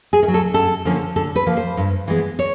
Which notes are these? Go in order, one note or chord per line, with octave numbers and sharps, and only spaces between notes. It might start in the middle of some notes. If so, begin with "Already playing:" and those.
G#4
D#3
F#3
A4
F#2 A4
D3 F3 A#3 C#4
D3 A4
B4
F3 A#3
C5
G2
E3 G#3 B3
C#5